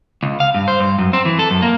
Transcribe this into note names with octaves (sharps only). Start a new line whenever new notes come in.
C#2
F5
G2
C5
G2
F#2
C4
E3
A4
F#2
A#3